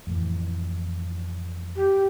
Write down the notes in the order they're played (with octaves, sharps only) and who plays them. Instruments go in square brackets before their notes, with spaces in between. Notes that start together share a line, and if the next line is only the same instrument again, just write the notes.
[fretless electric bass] F2 A2 E3
[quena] G4